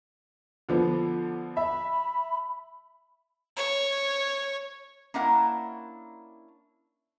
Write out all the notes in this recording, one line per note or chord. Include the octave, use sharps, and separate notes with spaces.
D3 F3 B3
E5 B5
C#5
A#3 C#4 D4 E4 A#4 F#5